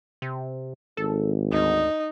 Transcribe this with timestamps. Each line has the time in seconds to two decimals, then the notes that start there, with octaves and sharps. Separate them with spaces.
0.22 C3
0.97 G#1 A4
1.52 D2 D#4